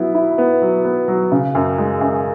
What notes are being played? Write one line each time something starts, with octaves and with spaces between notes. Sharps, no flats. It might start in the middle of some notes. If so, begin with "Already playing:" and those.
Already playing: F#3 B3 E4
E4
B3
F#3
B3
F#3
C#3
F#2
G#3
F#2